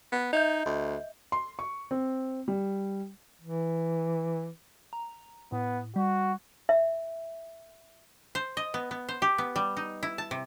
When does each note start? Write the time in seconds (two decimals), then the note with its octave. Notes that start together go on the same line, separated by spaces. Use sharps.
0.12 B3
0.33 D#4 D#5 E5 G6
0.65 D2
1.32 C6
1.59 C#6
1.91 C4
2.48 G3
3.41 E3
4.93 A#5
5.52 A2 B3
5.96 G3 F#4
6.69 E5
8.35 C5
8.57 D#5
8.74 B3
8.91 B3
9.09 C5
9.22 G4
9.38 B3
9.56 G3
9.77 D#4
10.03 E4
10.18 A5
10.31 C3